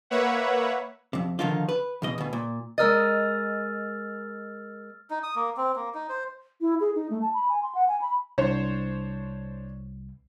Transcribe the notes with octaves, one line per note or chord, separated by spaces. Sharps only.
A#3 B4 C#5 E5 F#5
F2 C3
D3 D#3 F3 D#4 F4
B4
E2 B2 D#5
D2 B2
A#2
G#3 A#4 D#5 E6 F6 A6
D#4
D#6
A#3
C4
A#3
D#4
C5
E4
G#4
D#4
A3
A5
B5
G#5
C6
F#5
G#5
B5
C2 D4 C5 C#5